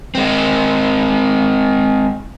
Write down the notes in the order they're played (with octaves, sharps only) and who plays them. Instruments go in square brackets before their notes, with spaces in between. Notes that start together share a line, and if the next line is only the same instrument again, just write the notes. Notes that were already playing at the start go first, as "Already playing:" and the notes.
[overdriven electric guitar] G#3 C4